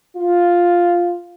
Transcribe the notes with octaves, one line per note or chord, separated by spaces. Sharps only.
F4